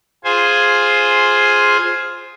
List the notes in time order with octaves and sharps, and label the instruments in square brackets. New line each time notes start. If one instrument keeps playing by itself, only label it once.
[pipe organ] F4 G#4 C5 G#5